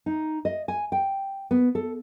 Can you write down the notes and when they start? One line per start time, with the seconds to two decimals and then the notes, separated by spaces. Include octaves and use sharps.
0.06 D#4
0.45 D#5
0.68 G#5
0.92 G5
1.51 B3
1.75 A4